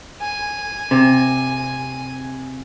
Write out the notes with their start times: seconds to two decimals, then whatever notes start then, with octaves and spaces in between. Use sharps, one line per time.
0.21 G#5
0.91 C3